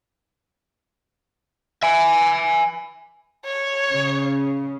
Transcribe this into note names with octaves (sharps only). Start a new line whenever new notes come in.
E5 G#5
C#5
C#3